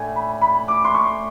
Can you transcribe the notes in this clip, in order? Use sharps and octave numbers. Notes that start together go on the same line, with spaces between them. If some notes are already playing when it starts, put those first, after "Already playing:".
Already playing: A2 A3 D4 G#5
B5
B5
D6
C6
C#6